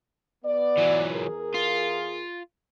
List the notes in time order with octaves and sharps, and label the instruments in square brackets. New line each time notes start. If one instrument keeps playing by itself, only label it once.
[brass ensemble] B3 D5
[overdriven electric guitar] E3 F#3
[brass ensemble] E2 G#4 A#4
[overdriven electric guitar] F4